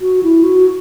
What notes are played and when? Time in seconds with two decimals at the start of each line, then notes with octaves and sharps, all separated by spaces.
0.01 F#4
0.23 E4
0.43 F#4